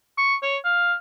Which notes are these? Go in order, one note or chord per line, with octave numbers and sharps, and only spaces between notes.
C#6
C#5
F5